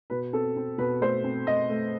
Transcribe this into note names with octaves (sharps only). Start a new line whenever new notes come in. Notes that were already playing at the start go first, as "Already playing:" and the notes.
B2 B4
C4 A4
C4
B2 B4
A3 C5
C4
A3 D#5
A3